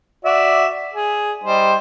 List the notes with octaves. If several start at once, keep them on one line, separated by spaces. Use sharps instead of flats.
F#4 D5 E5
G#4
G3 D#4 C5